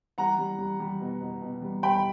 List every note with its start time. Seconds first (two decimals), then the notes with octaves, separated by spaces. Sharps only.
0.18 G3 F#5 A#5
0.39 G3
0.59 G3
0.80 G3
1.00 B2
1.21 B2
1.42 B2
1.62 G3
1.83 G3 G5 B5